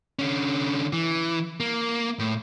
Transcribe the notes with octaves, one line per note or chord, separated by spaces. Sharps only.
D3 C#4
E3
A#3
A2